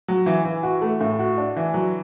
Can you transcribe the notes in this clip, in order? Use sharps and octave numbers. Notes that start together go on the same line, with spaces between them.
F#3
E3
E3
F#4
A3
A2
F#4
D4
E3
F#3